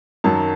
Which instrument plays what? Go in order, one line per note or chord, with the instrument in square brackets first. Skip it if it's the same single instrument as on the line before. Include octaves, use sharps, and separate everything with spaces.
[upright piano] F#2 D#3 F#3 A5